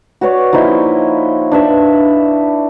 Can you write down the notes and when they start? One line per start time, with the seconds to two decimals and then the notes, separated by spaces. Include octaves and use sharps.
0.21 F#4 B4 C#5 D5
0.53 F3 A#3 D#4 E4
1.52 D4 B4 E5